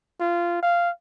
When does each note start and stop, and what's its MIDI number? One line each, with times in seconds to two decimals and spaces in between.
0.20 0.61 65
0.63 0.90 77